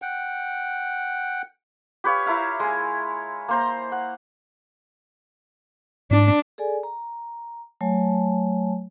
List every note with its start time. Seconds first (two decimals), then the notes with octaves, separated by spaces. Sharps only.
0.02 F#5 G5
2.04 G4 B4 C#5 F5
2.26 E4 A#4 E5 F5
2.60 G#3 G#5
3.48 A#3 C5 A#5
3.92 F#5
6.11 G#2 D4
6.58 G#4 A4 D5 G#5
6.83 A#5
7.81 F#3 A3 C#5 G#5 A5